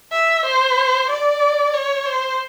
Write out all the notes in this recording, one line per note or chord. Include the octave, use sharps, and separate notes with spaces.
E5
C5
D5
C#5
C5